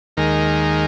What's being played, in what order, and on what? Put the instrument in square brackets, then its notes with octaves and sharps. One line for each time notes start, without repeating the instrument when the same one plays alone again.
[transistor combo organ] D#2 D#3 G#3 A#4